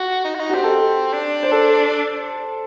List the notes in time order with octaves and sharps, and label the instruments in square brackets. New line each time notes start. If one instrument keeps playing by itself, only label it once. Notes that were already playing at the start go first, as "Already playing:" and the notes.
Already playing: [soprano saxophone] F#4
D#4
F#4
D#4
[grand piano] F#4
[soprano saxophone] C4 [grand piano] G4
[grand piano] A4
[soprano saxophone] D4
[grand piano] C5
A4